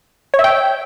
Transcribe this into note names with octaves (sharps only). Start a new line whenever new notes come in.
C#5
E5
G5